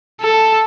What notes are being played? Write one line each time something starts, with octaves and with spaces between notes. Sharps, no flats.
A4